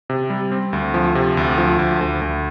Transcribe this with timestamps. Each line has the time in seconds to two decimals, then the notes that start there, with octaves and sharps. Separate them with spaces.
0.10 C3
0.30 G3
0.52 C4
0.73 D2
0.94 F3
1.15 C3
1.37 D2
1.58 F3
1.79 D2
2.01 D2
2.21 D2